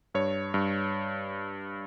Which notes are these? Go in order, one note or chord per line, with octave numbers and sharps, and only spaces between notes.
G2 C#5
G2